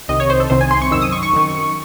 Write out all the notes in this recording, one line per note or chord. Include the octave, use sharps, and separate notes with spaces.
C2 C3 D#3 D#5
C#5
C5
A4
C2 C3 D#3 C5
G#5
C6
C#6
F#2 D#3 E6
D#6
C#6
C#6
F#2 D#3